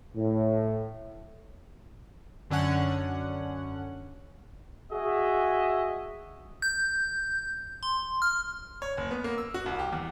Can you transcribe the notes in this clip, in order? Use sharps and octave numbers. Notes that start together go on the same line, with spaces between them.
A2
F#2 D3 C#4 F#5
F#4 G#4 D#5 E5
G6
C6
F6
C#5
F#1
B3
A#3
E6
F#4
C2
G4
E2